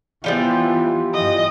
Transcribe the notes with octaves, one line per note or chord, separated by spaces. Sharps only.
E3 F3 G3 B3 F4
G2 E3 D#5